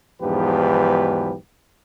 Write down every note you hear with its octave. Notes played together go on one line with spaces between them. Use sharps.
B1 E2 G#2 F3 G4 B4